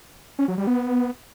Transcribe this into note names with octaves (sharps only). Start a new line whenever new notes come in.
C#4
F#3
G3
B3